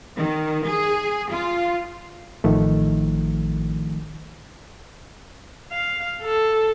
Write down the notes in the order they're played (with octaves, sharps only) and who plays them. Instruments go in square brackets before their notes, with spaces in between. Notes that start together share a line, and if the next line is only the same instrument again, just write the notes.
[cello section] D#3
G#4
F4
[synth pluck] A1 [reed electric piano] D#3 F3 A3
[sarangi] F5
A4